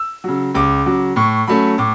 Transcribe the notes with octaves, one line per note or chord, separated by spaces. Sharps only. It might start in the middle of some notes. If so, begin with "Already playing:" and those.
Already playing: E6
C#3 F#3
C#2 D6
C#3 F#3
A2 C#6
F#3 A3 C#4 B5
A2 D6